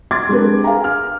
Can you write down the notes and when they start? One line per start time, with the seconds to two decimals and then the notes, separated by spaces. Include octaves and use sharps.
0.11 C6 D6 G#6 A6
0.29 G#3 C4 D4 G4 A#4 B4
0.64 G#4 F5 G#5 A#5
0.84 F6